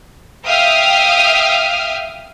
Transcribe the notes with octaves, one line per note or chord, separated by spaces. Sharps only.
E5 F5 G5 D#6 F6